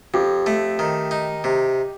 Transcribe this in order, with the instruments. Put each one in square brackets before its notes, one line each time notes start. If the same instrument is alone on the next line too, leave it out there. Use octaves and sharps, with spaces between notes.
[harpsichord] F2 [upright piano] G4
[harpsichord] A3
D#3
D#4
C3